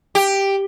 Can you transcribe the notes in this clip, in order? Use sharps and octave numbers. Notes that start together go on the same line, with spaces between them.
G4